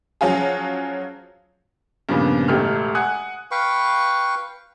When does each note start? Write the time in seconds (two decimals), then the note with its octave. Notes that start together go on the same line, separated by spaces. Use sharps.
0.21 F3 F#3 C#4 F4 G#4
2.09 G2 A#2 C#3 F3 B3
2.48 E1 A1 A3 G4 F6
2.95 F#5 G#5 D#6 F#6
3.51 B4 F5 G5 C#6